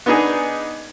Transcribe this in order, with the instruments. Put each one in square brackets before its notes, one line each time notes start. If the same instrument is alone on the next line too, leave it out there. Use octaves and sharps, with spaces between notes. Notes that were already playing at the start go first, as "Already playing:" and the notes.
[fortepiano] B3 D4 D#4 G#4